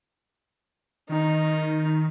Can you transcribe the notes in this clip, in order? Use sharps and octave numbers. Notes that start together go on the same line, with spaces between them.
D#3 D#4